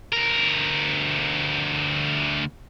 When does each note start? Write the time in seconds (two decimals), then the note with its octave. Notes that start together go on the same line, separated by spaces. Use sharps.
0.13 D2 A#4